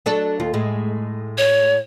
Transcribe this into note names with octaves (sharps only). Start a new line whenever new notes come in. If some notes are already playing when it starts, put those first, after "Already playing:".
F#3 D4 A4
D#2 F4
A2 G#3
C#5